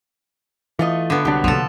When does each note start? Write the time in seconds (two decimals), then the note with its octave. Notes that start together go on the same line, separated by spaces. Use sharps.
0.79 E3 A3 F4 D#5
1.10 D3 B3
1.25 C2 F#3 D4 G4
1.44 C3 F3 A#3 A4